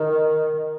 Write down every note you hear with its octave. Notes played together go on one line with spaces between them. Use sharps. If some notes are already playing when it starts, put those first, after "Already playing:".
Already playing: D#3